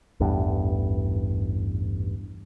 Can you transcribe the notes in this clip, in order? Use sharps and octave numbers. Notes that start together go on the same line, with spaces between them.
A1 E2 G2